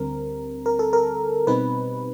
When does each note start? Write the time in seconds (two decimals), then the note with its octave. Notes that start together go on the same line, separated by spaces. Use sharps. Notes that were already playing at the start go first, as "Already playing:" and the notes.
Already playing: D2 D3 G3 C4 A#4
0.66 A#4
0.79 A4
0.93 A#4
1.47 B2 G3 C4 D#4 B4